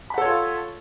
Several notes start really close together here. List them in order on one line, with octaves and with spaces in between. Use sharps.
B5 F#5 A4 C#5 F4